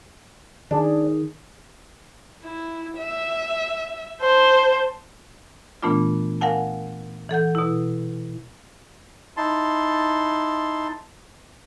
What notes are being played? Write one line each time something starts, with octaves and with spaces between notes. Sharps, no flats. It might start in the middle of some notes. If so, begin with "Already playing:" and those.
D#3 D4 G#4
E4
E5
C5 A5
A#2 E3 A3 B3 D4 F4
A#4 F5 F#5 G#5 A5
E3 A4 F#5 G6
B2 E4
D#4 E4 A5 C6